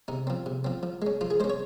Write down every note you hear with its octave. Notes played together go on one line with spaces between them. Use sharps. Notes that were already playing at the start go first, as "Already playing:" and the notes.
C3 D#4
F3 C4
C3
F3 C4
F3
G#3 C#4
F3 F4
G#4
G#3 C#4 C5
C#5